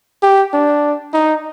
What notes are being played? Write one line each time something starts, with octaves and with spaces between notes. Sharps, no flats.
G4
D4
D#4